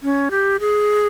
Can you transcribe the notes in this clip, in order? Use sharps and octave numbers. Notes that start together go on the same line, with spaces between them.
C#4
G4
G#4